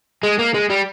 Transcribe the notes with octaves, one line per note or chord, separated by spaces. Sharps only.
G#3
A#3
G#3
G3